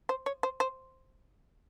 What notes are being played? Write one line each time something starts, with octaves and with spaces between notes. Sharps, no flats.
C5
C#5
C5
C5